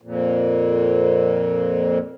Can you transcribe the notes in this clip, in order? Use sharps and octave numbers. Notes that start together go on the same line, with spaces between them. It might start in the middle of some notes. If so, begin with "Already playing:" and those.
F2 A#2